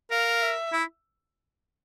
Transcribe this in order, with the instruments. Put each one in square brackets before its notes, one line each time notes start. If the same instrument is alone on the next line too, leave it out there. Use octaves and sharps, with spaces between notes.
[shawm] A#4 [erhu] F5
[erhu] E5
[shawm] E4